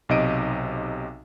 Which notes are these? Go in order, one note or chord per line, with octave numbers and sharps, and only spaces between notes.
B1 C3 D#4 D#5 D7 D#7